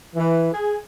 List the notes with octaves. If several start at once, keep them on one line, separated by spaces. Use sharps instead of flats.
E3
G#4